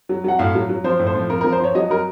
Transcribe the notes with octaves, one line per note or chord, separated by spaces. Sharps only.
F#3
F#3 F#5
A2 F5
F#3
F#3
F3 C5
A2
C5
F3
F3 A#4
F3 A#4
C5
F3 C#5
F#3 D#5
F#3 A#4